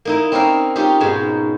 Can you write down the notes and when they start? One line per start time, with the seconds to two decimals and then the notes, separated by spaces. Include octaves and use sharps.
0.05 A#3 D#4 E4
0.32 C4 C#4 D#4 A#4 D5 F5
0.76 C#4 D#4 F4 G4
1.00 G#2 B2 G#3